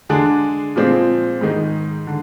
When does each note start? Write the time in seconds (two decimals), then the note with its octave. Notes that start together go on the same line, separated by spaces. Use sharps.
0.09 D3 G#3 D4 G#4
0.76 A#2 F3 G#3 C4
1.41 G#2 D#3 G#3 D#4
2.07 D3